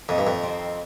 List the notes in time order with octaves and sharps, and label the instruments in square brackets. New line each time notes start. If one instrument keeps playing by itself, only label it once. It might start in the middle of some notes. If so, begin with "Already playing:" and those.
[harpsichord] F2 [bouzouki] A#2 A3 D#4
[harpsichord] G2
F2
[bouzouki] D#3 G3 C4